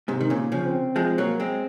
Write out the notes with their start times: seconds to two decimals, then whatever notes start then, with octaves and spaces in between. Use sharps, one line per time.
0.08 G#2 C3
0.21 D#3
0.30 A#2 C#3
0.52 C#3 F3
0.63 C4
0.96 F3 G#3
1.18 F#3 A#3
1.40 G#3 C4